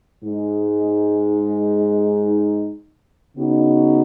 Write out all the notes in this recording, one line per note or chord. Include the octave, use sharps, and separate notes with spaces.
G#2 G#3 D#4
C#3 B3 D#4 F#4